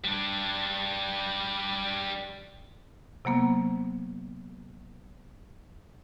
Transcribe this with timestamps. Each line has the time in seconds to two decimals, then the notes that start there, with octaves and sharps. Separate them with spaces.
0.04 G3 D4
3.25 C3 F#3 A#3 B3